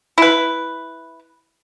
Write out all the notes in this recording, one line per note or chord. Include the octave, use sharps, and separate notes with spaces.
E4 B4